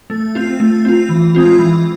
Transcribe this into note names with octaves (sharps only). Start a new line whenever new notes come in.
A3
C4 F4
A3
C4 F4
E3
G#3 C4 F4
E3